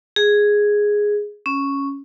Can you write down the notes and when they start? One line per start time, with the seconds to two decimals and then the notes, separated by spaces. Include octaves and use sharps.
0.16 G#4
1.46 C#4